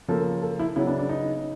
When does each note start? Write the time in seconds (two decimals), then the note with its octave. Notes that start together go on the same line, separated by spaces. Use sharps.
0.08 C#3 F3 A#3 A4
0.42 A4
0.59 E4
0.76 C#3 F#3 B3 E4
0.87 D4
0.98 D4
1.09 D#4